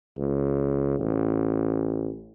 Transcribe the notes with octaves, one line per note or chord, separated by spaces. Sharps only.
C#2
A1